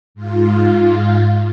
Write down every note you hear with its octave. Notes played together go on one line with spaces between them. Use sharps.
G#2 F4